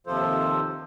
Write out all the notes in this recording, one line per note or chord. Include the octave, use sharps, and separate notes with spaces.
D#2 C3 F3 F4 A4 C5